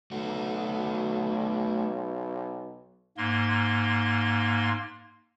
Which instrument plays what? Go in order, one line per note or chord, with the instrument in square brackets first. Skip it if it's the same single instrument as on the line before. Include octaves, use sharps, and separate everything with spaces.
[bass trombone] B1 [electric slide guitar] A3 F#4
[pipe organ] G#2 A#3 C6